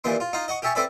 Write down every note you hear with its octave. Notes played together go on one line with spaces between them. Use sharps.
D#2 A#2 E3 D4 C6
F4
D#4 F4 F5
D#5 F#5 C#6
G4 G#4 E5 A5 C#6
C4 A4 B4 D5 E5